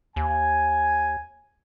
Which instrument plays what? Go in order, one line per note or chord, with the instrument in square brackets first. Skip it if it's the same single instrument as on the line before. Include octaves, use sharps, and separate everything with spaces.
[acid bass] D#2 [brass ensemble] G#5